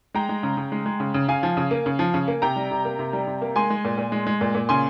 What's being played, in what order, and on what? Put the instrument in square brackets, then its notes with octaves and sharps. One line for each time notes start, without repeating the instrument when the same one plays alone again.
[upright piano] G#3 G5 A#5
G#3
C#3
C#3
G#3
G#3
C#3
C#3
C#3 F5 G#5
F3
C#3
A#3
C#3
F3
C#3
A#3
C3 G5 A#5
G3
C3
A#3
C3
G3
C3
A#3
G#3 G#5 C6
G#3
A#2
A#2
G#3
G#3
A#2
A#2
C#3 G#5 C6